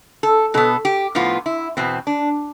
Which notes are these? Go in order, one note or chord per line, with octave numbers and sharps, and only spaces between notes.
A4
B2 B3 A4
G4
A2 F3 B3 F4
E4
E2 B2 B3 C4
D4